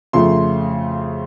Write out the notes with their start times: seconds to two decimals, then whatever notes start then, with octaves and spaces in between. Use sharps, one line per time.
0.13 F2 C#3 F3 A3 C6